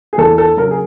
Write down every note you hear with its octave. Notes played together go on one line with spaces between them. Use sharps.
G#4
E2 A4
A4
C#3 F#3 A#4
G#4